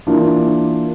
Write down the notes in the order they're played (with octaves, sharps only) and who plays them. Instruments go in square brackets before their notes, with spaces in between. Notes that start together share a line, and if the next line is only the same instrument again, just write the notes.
[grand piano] E3 A#3 D4 F4